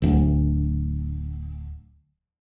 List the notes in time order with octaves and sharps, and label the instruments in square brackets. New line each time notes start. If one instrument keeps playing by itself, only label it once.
[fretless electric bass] D1 D2